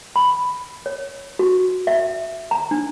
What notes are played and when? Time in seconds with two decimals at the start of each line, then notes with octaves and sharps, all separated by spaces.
0.16 B5
0.86 C#5
1.39 F#4
1.87 E5
2.51 A#5
2.71 D4